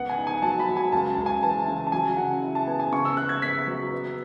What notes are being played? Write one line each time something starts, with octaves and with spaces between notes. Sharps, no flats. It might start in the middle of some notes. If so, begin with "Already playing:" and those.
Already playing: C#2 B3 F#5
G#5
D#4
G#5
F#3 A5
B5
F#3
G#5
C#2 A5
C#2
G#5
E3 A5
C#3
A5
F#3 G#5
C#3 F#5
E4
A5
B3 G#5
G#5
C#3 C#6
E6
B3 F#6
G#6
B3 B6
F#3
B3